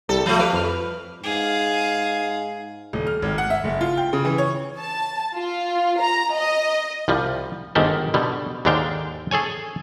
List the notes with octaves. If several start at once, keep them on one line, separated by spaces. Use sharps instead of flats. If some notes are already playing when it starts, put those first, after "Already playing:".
C2 G3 A4
F3 A3 F5 G6
B4 D6 F6
F2 F6
G#2 G#4 F5
D#1
F6
G#1
F#5
E5
F#1
F4
G5
C#3
E3
C#5
A5
F4
A#5
D#5
C2 F3 G3
G1 G#2 D#3 G4 A4
B2 D3 G3
D#2 G#2 D3 D4 F5 G5
G#4 A4 C#5 G#5